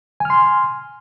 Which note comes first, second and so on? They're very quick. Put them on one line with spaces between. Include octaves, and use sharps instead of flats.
G#5 F6 C6